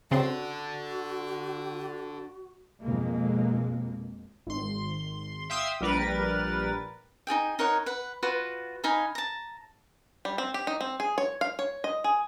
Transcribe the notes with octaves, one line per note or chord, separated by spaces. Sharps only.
C#3 C4 D4 F#4 A4 C6
F2 B2 G#3 A#3
G#1 C6
E5 F5 G5 C6 D#6 E6
A#1 G3 A#4 B4 A6
D#4 F#4 G#4 G5
D#4 A#4 C#5 F#5
B4 F#5
F4 F#4 B4
D#4 F5 G#5 B5
A5 A#5
G3
C4
G4
D#4
C4
G#4
C#5
F5
C#5
D#5
G#4